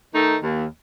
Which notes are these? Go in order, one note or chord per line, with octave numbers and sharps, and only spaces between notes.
D#3 A3 D#4
D#2